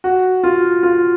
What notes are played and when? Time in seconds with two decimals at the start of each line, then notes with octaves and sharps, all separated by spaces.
0.04 F#4
0.44 F4
0.83 F4